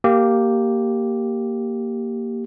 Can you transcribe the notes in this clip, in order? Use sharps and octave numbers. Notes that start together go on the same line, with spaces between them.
A#3 G4